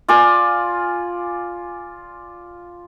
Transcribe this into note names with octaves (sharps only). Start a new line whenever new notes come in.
F4 D5 G#5